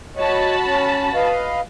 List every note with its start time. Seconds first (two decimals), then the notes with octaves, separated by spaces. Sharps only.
0.17 F#4 C#5 D#5 A5 B5
0.65 C#4
1.14 B4 D#5 F5